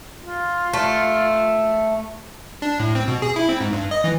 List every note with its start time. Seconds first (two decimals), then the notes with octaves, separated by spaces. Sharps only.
0.20 F4
0.73 A3
2.62 D4
2.80 A2
2.95 C4
3.08 B2
3.22 G#4
3.36 E4
3.49 C4
3.61 G#2
3.73 G2
3.91 D#5
4.04 E3